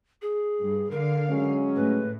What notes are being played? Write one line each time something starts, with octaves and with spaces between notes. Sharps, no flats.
G#4
G2
D3 A#4 F5
F#3 G#3 C#4
A2 B4